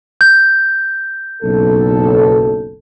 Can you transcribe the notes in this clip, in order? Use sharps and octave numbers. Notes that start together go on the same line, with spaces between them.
G6
F#1 B1 A4